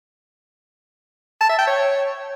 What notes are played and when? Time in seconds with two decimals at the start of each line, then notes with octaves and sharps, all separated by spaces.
1.41 A5
1.49 E5
1.58 G5
1.67 C#5